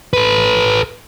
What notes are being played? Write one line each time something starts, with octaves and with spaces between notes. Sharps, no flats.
A4 B4